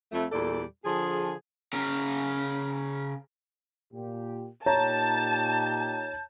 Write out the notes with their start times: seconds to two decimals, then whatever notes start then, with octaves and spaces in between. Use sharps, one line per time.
0.12 F2 A3
0.32 E2 A#2 G3 A4 D5
0.84 D3 F3 G#4
1.73 C#3 A#4
3.92 A#2 G4
4.66 A#2 D#4 G4 C#5 A5 A#5 G6